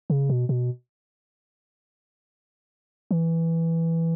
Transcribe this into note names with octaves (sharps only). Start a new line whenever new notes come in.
C#3
B2
B2
E3